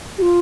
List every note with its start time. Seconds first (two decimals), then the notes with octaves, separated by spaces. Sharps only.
0.18 G4
0.22 F4